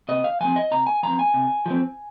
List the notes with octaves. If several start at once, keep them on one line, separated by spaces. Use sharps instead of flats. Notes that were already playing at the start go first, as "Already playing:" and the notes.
C3 D#5
F5
F3 C4 G#5
D#5
C3 A#5
G#5
F3 C4 A#5
G#5
C3
F3 C4